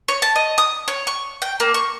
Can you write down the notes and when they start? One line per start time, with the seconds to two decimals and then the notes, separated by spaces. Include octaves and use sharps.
0.08 C#5
0.22 A5
0.36 D#5
0.58 D#6
0.88 C#5
1.07 C#6
1.42 G5
1.60 A#3
1.74 C#6